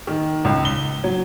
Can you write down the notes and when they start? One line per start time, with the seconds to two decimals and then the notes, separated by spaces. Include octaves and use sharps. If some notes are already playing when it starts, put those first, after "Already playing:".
0.07 D#3
0.45 C#2
0.65 G7
1.04 F#3